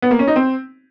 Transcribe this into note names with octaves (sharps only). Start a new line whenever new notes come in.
B3
A#3
C#4
D#4
C4